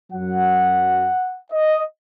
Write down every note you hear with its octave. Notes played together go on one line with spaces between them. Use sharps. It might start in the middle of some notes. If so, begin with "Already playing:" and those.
F#2 F#3 F#5
D#5